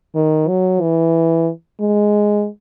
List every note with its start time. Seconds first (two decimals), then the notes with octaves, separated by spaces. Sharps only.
0.15 D#3
0.48 F#3
0.81 E3
1.80 G#3